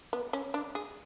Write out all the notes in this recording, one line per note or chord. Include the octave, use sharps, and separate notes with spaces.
B3
C#4
D4
G#4